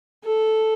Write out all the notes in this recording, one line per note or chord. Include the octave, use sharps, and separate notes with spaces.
A4